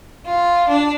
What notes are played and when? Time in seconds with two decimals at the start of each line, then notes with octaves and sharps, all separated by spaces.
0.25 F4
0.67 D4